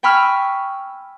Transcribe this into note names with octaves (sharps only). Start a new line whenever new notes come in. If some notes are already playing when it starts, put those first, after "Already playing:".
G5 G#5 B5 C#6 E6 F6